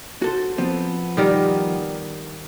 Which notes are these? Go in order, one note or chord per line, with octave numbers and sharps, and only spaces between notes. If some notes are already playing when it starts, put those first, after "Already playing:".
F#4 A4 C5
F3 B3 C4
D#3 G3 A#4